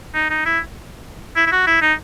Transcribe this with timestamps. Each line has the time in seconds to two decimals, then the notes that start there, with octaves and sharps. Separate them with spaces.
0.15 D#4
0.30 D#4
0.46 E4
1.36 E4
1.47 E4
1.52 F#4
1.67 E4
1.82 D#4